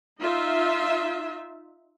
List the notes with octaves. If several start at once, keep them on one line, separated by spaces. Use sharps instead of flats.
D#4 F4 E5